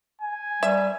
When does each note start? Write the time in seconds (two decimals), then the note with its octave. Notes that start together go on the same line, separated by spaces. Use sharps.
0.21 G#5
0.63 G3 E5